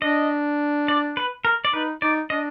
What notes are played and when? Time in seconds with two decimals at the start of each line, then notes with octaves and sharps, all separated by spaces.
0.02 D4 D#5
0.88 D5
1.17 B4
1.45 A#4
1.65 D5
1.73 D#4 B4
2.02 D#4 D5
2.30 D4 D#5